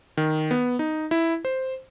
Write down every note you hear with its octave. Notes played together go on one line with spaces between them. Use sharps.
D#3
B3
D#4
E4
C5